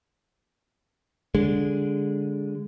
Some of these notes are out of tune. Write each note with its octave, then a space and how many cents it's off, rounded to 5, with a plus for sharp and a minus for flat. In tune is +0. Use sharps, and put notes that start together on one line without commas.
D3 -20 G#3 -20